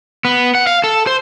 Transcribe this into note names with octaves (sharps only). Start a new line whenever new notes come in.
B3
F#5
F5
A4
C5